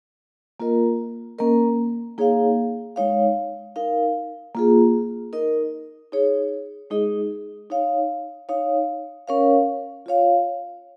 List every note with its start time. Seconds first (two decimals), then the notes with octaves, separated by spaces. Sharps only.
0.60 A#3 F4 A#4 D#5
1.39 A#3 C#4 A#4 D#5
2.18 A#3 D#4 G#4 C#5 F5
2.96 G#3 D#4 C#5 F5
3.76 D#4 A#4 F5
4.55 A#3 F4 G#4
5.33 D#4 A#4 D#5
6.12 D#4 G#4 C#5
6.90 G#3 D#4 G#4 D#5
7.70 D#4 C#5 F5
8.49 D#4 C#5 F5
9.28 C#4 A#4 C#5 F5
10.06 F4 C#5 F5